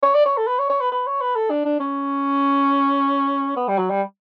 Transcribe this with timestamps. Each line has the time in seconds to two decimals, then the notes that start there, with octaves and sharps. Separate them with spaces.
0.03 C#5
0.15 D5
0.25 C#5
0.37 A4
0.47 B4
0.59 C#5
0.70 C#5
0.80 B4
0.92 B4
1.07 C#5
1.21 B4
1.36 A4
1.50 D4
1.65 D4
1.80 C#4
3.56 B3
3.68 G3
3.78 F#3
3.90 G3